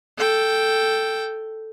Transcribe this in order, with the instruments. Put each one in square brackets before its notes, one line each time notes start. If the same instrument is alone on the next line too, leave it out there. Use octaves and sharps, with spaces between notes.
[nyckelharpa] A4 G5